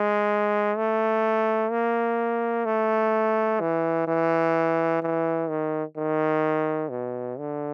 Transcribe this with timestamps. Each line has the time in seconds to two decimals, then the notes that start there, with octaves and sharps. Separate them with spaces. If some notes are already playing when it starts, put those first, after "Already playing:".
Already playing: G#3
0.77 A3
1.71 A#3
2.65 A3
3.60 E3
4.08 E3
5.02 E3
5.50 D#3
5.97 D#3
6.91 B2
7.39 D3